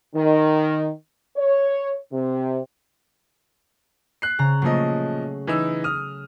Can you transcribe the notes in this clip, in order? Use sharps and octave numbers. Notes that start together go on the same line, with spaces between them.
D#3
C#5
C3
F#6 C7
C#3 A#5
A#2 F3 F#3 A3 D#5
E3 D#4 E6
D#6 F6